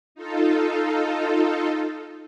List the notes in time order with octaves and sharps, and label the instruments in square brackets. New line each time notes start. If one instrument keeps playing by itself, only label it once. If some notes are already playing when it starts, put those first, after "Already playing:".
[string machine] D#4 F4 A4